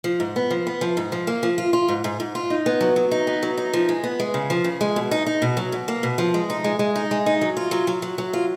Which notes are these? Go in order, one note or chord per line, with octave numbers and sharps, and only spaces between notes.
F3
G#2
B3
F3
B3
F3
G#2
F3
A#3
F3
F4
F4
G#2
G#2
G#2
F4
D#4
B3
F#3
F#3
D#4
B3
F#3
D#4
F3
G#3
B3
G#3
C#3
F3
C#3
G#3
B2
D#4
D#4
B2
F#3
B2
A#3
B2
F3
G#3
D#4
G#3
G#3
D#4
G#3
D#4
F#3
F4
F#3
F#3
F#3
F#3
F4